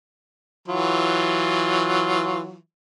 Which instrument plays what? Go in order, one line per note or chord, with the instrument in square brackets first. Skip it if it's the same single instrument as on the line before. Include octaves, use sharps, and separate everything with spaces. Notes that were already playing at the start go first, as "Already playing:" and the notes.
[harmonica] E3 F#3 F4